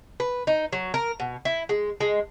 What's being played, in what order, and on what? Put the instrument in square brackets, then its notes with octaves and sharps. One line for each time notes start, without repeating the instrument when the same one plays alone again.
[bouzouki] B4
D#4
F#3
A#4
B2
E4
G#3
G#3